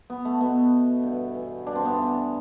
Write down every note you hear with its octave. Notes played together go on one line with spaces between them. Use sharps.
B3
A3
B2 B3
G2
E3
G2 D4
C4
B3 D4
E3